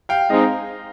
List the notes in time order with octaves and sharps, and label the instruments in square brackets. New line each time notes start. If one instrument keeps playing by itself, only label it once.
[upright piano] F5 G5
[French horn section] G#3 C4 D#4 [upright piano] D#5 F5